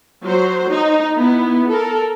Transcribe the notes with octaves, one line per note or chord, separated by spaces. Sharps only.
F#3 C5
D#4
B3 E4
A4 A#4